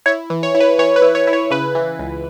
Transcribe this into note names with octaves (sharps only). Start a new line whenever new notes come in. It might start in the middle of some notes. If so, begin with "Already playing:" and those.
E4 C#5
E3
C#5
E4
B4
E3 C#5
B4
E4
C#5
E4
C#5
C#3 B4
E3
C#2